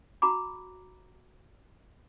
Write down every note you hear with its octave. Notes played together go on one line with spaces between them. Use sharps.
F#4 A#5 B5 D6